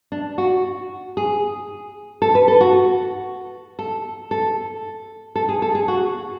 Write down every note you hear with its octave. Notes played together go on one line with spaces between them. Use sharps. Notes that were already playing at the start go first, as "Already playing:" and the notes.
D4
F#4
G#4
A4
B4
A4
F#4
A4
A4
A4
G#4
A4
G#4
F#4